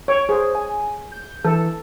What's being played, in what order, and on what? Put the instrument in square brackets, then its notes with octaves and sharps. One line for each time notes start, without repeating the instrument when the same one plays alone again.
[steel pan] C#5 [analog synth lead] D7
[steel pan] G#4 [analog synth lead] C5
[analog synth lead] G#5
G6
[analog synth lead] E3 [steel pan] A4